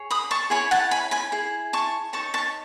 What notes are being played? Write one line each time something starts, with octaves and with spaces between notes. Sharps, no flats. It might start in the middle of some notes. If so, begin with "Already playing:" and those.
Already playing: G#4 C#5
B5 D#6
A5 C#6
E4 G#4 C#5 G#5 B5
F#5 A5
G#5 B5
G#5 B5
E4 G#4
A5 C#6
D#4 A4 C#5 A5 C#6
A5 C#6